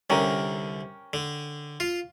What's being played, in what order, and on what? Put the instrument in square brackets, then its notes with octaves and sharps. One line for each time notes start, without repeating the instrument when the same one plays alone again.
[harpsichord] C2 D3 [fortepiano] C#4 G4 A#4
[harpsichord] D3
F4